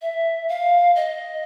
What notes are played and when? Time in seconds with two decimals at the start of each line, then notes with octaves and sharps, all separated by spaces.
0.02 E5
0.49 F5
0.96 D#5